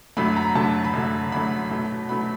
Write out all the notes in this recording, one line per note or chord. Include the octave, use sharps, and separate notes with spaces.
F#2 D3 F#3 A3 B5
A#5
F#2 D3 F#3 A3 A5
B5
F#2 D3 F#3 A3
F#2 D3 F#3 A3 B5
B2 F#3 A3
B2 F#3 A3 B5